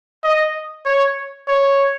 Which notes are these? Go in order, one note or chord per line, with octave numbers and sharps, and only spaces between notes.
D#5
C#5
C#5